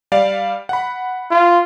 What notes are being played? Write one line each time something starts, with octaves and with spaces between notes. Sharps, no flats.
G3 D5 F5
F#5 B5
F4